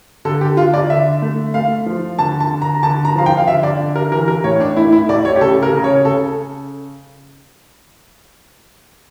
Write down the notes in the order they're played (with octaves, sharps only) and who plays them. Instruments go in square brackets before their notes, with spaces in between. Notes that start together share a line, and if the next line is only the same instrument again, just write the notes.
[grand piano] D3 A4
G4
D3 F4
D5
D3 E5
A3
A3 F5
F3
D3 A5
A5
D3
A#5
D3 A5
A#5
F3 F5
G5
F5
D3 E5
D5
D3
A#4
E3 A#4
A#4
A2 C#5
D4
A3 E4
E4
A2 D5
C#5
G4
C#3 A4
A#4
C#3
C#5
C#3 A4